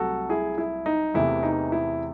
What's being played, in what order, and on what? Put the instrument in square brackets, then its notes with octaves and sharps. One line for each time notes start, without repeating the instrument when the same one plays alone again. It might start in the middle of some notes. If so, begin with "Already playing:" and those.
Already playing: [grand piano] C2 C3 F#3 A3 F#4 A4
E4 G#4
E4
D#4
E2 C3 E3 A3 E4
D#4
E4